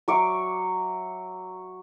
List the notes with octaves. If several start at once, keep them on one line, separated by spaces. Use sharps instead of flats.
F#3 E5 C#6 D6